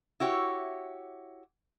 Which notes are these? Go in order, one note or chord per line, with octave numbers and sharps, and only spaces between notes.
E4 F#4 G4 C#5